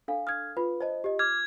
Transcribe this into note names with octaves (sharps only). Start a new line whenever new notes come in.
D4 A4 F5
D#6 F6 G#6
F4 B4
C5 D5 D#5 A5
G4 D#5
D6 F6 G#6